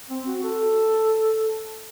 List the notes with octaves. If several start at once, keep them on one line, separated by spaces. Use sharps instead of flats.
C4
F#4
A4